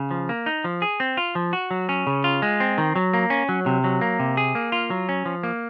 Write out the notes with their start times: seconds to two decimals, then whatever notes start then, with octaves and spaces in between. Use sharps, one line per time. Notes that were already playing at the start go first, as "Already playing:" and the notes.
Already playing: C#3
0.11 F3
0.29 A#3
0.46 D#4
0.64 F3
0.82 G#4
1.00 C4
1.17 F4
1.35 F3
1.53 F#4
1.71 F#3
1.89 C#4
2.07 C#3
2.24 F4
2.42 G#3
2.60 C4
2.78 D#3
2.96 F#3
3.14 A#3
3.30 C#4
3.49 F#3
3.66 C3
3.84 F#3
4.01 A#3
4.19 C3
4.37 G#4
4.55 A#3
4.72 F4
4.90 F#3
5.09 C#4
5.26 F3
5.43 A#3